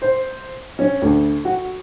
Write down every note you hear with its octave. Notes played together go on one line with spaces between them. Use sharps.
C5
C#4
D2
F#4